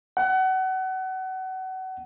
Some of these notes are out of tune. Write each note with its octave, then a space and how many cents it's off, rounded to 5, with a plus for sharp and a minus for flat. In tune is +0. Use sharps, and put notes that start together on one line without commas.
F#5 +30